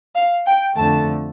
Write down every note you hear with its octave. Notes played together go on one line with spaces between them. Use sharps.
F5
G5
F2 D3 A3 A5